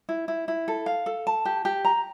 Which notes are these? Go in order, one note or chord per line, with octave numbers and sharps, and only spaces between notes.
E4
E4
E4
A4
F5
A4
A5
G4
G4
A#5